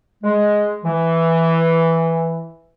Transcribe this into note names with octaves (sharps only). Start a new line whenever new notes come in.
G#3
E3